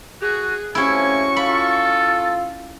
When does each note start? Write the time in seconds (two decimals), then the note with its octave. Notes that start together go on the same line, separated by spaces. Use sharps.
0.22 F#4 G#4
0.75 C3 F3 A3 C#4 E4 F#4 G#5 C#6
1.36 F4 A4 B5